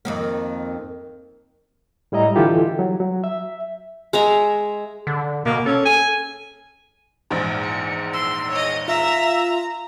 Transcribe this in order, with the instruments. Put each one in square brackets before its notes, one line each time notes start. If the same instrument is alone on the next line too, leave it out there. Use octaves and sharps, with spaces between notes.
[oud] F2 D#3 A#3
[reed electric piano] A2 G3 E4 D#5 A#5
D3 E3 E4 F4 G4 A4
F#3
F#3
E5
[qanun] G#3 E5 A#5
[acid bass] D3
[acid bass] B2 [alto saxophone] A#3
[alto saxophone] C#4 [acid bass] A4
[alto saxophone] G#5
[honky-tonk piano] A#1 E2 G#2
[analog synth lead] C#7
[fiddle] C6 [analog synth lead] E6
[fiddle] C#5 D#5
[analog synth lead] F4 [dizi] E5 [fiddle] A#5